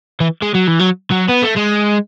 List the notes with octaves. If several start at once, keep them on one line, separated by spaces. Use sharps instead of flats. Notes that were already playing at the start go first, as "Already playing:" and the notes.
E3
G#3
F#3
E3
F#3
F#3
B3
A3
G#3